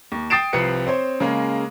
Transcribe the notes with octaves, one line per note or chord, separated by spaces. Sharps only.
D#2
G5 D#6 A6 C7 D7 E7
C2 C3 F3 B4 C#7
C4 C5 C#5
C#3 G#3 A#3